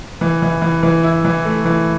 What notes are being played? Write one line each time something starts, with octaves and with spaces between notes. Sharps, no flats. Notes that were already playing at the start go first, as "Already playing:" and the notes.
E3
E3
E3
E3
E4
E3
A3
E3